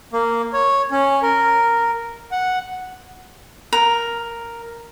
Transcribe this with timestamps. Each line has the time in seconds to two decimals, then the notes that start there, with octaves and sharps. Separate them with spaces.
0.13 A#3
0.53 C#5
0.91 C#4
1.22 A#4
2.31 F#5
3.73 A#4